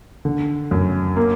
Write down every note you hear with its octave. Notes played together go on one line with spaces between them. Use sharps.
D3
F#2
A#3